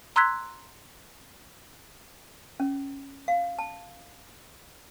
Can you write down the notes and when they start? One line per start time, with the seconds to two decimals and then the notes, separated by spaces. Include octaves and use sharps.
0.16 A#5 C6 E6 F#6 G#6 B6
2.60 C#4
3.28 F5
3.59 A5